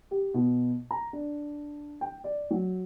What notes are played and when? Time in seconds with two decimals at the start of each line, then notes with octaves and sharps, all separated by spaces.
0.11 G4
0.34 B2
0.91 A#5
1.13 D4
2.01 G5
2.24 D5
2.51 F#3